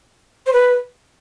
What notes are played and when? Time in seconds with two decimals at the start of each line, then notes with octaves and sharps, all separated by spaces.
0.47 C5
0.53 B4